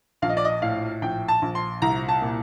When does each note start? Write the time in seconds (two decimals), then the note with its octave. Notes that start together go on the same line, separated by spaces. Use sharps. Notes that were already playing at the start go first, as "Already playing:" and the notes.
0.22 A#1 F5
0.29 D#5
0.37 D5
0.45 D#5
0.62 A2 F5
1.02 A#1 G5
1.28 A5
1.42 A#1
1.55 C6
1.82 C2 A#5
2.09 A5
2.22 A#2